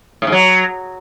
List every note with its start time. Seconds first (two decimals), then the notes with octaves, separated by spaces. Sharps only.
0.22 A2
0.27 G#2
0.32 F#3